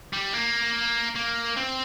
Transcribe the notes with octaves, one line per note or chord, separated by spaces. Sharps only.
G3
A#3
A#3
C4